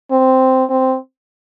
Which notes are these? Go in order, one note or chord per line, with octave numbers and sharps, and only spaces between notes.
C4
C4